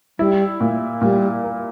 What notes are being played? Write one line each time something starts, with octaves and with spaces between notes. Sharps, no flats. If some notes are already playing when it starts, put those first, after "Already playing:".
G3 E4
A#2
A#2 G3
A#3